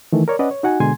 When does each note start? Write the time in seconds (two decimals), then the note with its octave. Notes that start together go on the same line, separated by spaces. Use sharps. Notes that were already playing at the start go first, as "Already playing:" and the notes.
0.12 D#3 E3 A3
0.28 A#4 C#5 D5
0.39 C#4 B4 D5 D#5 F#5
0.51 C#5
0.63 D#4 F#4 F#5 G#5
0.80 B2 D3 G#3 G#5 C6 G#6